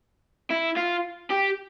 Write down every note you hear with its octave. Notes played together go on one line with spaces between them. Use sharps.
E4
F4
G4